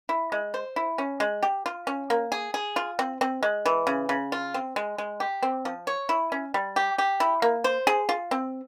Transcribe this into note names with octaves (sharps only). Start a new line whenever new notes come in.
E4
G#3
C5
E4
C#4
G#3
G4
F4
C#4
A#3
G#4
G#4
F4
C4
C4
G#3
E3
C#3
C#3
F4
C4
G#3
G#3
G4
C4
F3
C#5
E4
C#4
G3
G4
G4
E4
A#3
C5
G#4
F4
C4